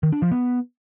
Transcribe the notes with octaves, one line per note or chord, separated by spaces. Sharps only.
D#3
D4
F3
B3